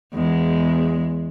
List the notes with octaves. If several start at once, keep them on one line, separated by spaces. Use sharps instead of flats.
E2 G#3